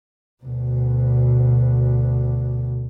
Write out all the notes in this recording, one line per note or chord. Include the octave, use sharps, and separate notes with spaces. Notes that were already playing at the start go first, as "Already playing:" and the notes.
D2 B2